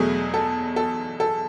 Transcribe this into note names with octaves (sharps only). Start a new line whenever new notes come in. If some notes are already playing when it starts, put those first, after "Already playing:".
Already playing: E2 B2 F#3 A3 G#4
A4
A4
A4